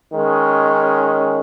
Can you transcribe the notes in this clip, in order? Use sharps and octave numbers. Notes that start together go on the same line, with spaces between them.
D#3 G#3 C#4